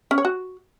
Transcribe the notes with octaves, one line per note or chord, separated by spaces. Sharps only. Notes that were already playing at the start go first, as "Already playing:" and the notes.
C#4
C#5
F#4